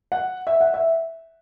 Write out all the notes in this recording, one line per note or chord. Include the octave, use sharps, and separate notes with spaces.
F#5
E5
F#5
E5